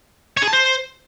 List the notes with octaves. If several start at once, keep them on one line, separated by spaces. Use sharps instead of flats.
C#5
G#4
A5
C5